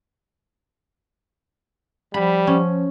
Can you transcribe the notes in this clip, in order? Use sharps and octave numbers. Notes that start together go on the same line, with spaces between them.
F3 G3 B5
F3 C#4